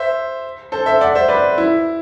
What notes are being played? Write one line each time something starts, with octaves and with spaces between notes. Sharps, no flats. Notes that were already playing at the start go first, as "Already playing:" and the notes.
Already playing: C5 E5
A4 C5
C5 E5
D5 F#5
C5 E5
B4 D5
E4